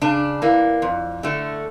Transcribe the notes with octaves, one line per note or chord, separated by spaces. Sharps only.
C#3 D4
E3 A#3
F2
D3 A3